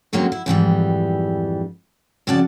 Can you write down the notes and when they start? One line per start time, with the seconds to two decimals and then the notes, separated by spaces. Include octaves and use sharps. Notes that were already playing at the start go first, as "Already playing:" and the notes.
0.13 D3 F#3 G#3 A#3 C4 C#4
0.32 E4
0.46 F2 G#2 E3 G3
2.27 F2 C#3 F#4 D5 F#5 A5